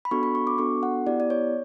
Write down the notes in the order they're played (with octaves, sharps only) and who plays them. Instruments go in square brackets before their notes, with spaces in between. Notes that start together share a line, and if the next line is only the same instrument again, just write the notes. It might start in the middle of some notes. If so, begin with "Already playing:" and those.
[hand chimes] B5
B3 D4 F#4 A4 C#6
B5
C#6
D6
B3 D4 F#4 A4 C#6
F#5
B3 E4 G4 D5
D5
C#5